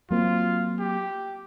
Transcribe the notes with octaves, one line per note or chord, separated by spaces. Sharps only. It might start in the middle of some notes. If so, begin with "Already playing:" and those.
F#3 A#3 C4 F4
G4